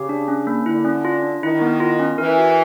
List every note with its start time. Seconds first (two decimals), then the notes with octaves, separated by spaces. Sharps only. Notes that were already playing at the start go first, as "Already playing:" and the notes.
Already playing: C#3 G4
0.09 D4
0.28 C#4
0.47 A#3
0.66 D3 E4
0.85 C#4
1.05 F4
1.23 D4
1.43 D#3 E4
1.61 B3
1.80 F4
2.00 C#4
2.18 E3 A#4
2.38 F#4